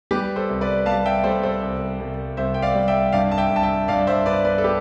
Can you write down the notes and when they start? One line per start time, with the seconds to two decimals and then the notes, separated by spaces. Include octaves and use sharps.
0.11 G3 G4 B4
0.36 A4 C5
0.49 C2
0.61 B4 D5
0.86 G3 F5 A5
1.06 E5 G5
1.24 G3 A4 C5
1.43 A4 C5
1.62 C2
1.99 C2
2.37 C2 C5 E5
2.54 G5
2.62 D5 F5
2.75 G3
2.88 E5 G5
3.12 G2 D5 F5
3.32 A5
3.38 E5 G5
3.50 G2
3.56 A5
3.63 E5 G5
3.88 G2 D5 F5
4.07 C5 E5
4.26 G2 B4 D5
4.45 B4 D5
4.58 A4
4.64 G4 B4